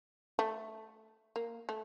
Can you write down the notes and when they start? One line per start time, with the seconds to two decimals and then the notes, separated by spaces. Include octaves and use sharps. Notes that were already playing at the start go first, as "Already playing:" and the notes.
0.39 A3
1.36 A#3
1.69 A3